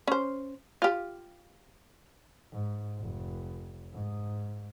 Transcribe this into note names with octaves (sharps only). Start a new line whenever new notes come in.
C#4 C5
F4 G4
G#2
F1
G#2